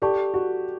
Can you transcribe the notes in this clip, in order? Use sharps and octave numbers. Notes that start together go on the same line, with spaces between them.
G4 A4 D5 A5 C#6
F#4